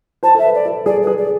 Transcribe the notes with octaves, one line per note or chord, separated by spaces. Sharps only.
C5 A5
A4
B4 E5
D5
A4
G#4 D5
G#4 B4
D5